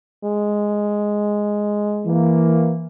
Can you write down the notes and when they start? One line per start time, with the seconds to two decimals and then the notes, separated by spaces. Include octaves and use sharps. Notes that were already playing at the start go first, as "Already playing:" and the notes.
0.24 G#3
2.06 E3 A#3